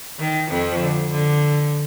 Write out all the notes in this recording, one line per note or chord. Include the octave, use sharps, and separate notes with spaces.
D#3
F2 F3
D3
D3